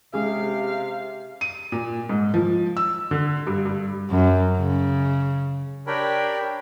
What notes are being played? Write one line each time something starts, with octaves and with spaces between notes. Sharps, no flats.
C3 G#3 C#4 G4 G#4 F5
D#7
A#2
G#2
F3
E6
D3
G2
G2
F#2
C#3
D4 G4 A#4 C#5 G5 B5